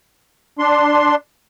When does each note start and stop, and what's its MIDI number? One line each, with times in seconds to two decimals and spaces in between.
0.59 1.15 62
0.59 1.15 84